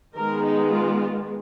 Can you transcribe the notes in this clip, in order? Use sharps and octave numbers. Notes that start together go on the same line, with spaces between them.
D#3 G#3 B3 A#4
D#4
F4